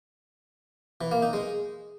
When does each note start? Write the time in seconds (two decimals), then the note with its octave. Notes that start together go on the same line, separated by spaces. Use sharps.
1.01 E3
1.12 A#3
1.22 D#4
1.33 G#3